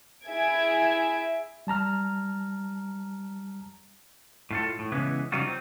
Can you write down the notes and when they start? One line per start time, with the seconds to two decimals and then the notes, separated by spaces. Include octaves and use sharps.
0.25 E4 G#4 E5 G#6 D7
1.67 G3 A5 A#5 F6
4.51 A2 F4 A4
4.79 A2
4.92 C#3 E3 G#3 B3
5.32 C#3 G3 D#4 F4 F#4
5.47 C4